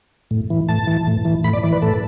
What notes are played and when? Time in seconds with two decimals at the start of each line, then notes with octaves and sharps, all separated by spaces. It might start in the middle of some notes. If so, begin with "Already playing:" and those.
0.31 A2
0.50 E3
0.69 A2 A5
0.87 E3
1.07 A2
1.25 E3
1.44 A2 B5
1.53 D5
1.63 E3 D5
1.73 B4
1.82 A2 A4